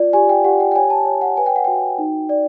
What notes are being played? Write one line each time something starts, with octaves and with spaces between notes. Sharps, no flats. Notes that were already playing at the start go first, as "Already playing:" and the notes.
Already playing: F4 D5
G4 G#5
G5
G4 F#5
G5
G5
C#5 G#5
A5
C#5
F#5
B4 G#5
G5
F#5
F#4 G5
D#4
D5